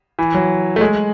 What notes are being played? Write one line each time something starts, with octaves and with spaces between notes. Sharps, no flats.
E3
F#3
A3
G#3